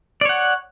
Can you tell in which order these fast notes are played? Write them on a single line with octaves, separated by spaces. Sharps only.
D5 C#5 F#5